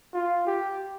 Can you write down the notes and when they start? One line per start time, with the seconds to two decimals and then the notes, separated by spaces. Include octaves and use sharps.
0.14 F4
0.47 G4